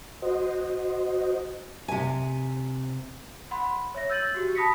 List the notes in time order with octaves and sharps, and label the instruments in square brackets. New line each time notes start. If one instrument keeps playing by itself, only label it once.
[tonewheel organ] F#4 C5 D#5
[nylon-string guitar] C3 G#5
[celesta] F#5 B5 C6
C#5 E5 A#6
E6 G6 A6 D#7 F#7
F#4 G4
A5 B5 D#6 A#6 B6 C#7